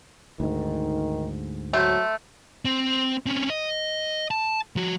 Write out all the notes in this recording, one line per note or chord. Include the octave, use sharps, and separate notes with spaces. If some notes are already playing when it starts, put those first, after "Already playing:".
D2 G#2 D#3
F#3 A3 C5
C4
C4 C#4
D#5
A5
F3 F#4